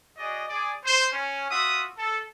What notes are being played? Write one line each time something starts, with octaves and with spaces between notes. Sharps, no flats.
F#4 G#4 D5 D#5
G#4 D5
C5
C#4
F4 F#4 E5 D#6
A4